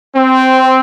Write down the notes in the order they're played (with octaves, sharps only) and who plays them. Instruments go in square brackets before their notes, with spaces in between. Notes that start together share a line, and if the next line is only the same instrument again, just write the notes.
[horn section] C4